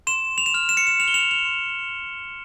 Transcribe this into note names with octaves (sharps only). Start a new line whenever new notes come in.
C6 E7
F7
E7
F6 F7
E7
C#7
E7
F6 F7
G7
F7
F7
C6